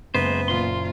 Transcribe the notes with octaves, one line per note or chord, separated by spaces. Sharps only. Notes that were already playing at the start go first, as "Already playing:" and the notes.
F#1 G#3 B3 C5
A#2 F4 C6